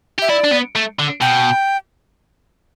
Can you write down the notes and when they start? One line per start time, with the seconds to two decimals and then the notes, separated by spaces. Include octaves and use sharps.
0.19 G4 E5
0.30 E4 D5
0.44 D4
0.52 B3
0.76 A3
0.99 D3
1.21 B2 G5